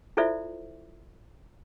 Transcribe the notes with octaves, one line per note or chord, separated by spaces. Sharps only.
E4 F4 A4 C5 D5 E5